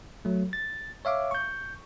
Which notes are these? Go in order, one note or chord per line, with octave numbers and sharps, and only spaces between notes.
F#3 A3
A6
C#5 E5 F5 D6
C#6 G6